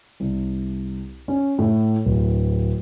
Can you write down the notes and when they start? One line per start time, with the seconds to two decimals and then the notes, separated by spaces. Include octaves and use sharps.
0.20 C2
1.28 C#4
1.59 A2
2.05 D1